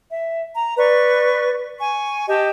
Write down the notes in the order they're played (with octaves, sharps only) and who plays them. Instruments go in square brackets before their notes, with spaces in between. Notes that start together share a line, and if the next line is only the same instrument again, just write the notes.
[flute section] E5
A#5
B4 D5 C#6
G#5 C#6
G4 D#5 G5 A5